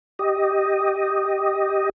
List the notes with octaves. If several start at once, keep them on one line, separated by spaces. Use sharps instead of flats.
G4 D#5